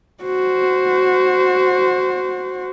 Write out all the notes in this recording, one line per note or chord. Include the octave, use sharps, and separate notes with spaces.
F#4 C5